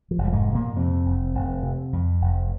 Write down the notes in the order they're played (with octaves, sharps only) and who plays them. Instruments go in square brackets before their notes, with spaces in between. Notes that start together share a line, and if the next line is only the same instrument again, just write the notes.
[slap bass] F3
F1
G3
G#2 G#3
C3
A#2 A#3
F2 C3 C4
F1
F1
C3
F2
F1